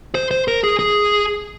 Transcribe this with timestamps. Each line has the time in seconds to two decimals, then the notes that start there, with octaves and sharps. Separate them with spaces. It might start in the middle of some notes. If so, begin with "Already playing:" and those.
0.15 C5
0.31 C5
0.48 A#4
0.64 G#4
0.79 G#4